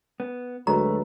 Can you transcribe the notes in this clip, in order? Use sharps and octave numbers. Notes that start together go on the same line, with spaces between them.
B3
D2 F#3 G#3 A3 B4 A#5